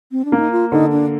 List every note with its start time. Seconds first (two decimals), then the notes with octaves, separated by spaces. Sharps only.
0.12 C4
0.25 D4
0.32 A#3
0.39 D#4
0.51 F4
0.71 D3 D#4
0.92 D4